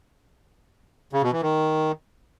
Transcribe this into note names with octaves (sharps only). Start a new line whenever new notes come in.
C#3
B2
E3
D#3